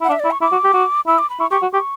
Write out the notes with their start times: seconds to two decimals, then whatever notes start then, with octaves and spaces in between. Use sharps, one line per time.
0.01 E4
0.04 F#5
0.09 D4
0.12 E5
0.20 D5
0.25 E4
0.31 C#6
0.41 E4 D6
0.52 F#4
0.64 G4
0.74 F#4
1.07 E4 E6
1.19 D6
1.30 B5
1.40 E4 C#6
1.51 G4 C#6
1.62 F#4
1.73 G4 C#6